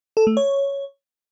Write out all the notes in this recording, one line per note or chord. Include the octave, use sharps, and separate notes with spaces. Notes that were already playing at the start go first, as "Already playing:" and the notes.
A4
A3
C#5